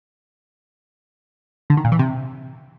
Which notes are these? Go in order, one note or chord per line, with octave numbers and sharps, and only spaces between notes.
D3
D#3
A#2
E3
C3